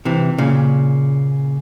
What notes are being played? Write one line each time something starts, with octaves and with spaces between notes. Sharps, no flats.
C3 E3
A#2 C#3